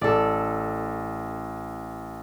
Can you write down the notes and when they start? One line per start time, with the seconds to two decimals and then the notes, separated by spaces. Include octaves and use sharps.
0.01 A1 A4 D5